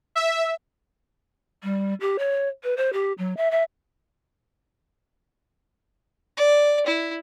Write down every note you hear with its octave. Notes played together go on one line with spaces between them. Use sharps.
E5
G3
G4
C#5
B4
C5
G4
F#3
E5
E5
D5
E4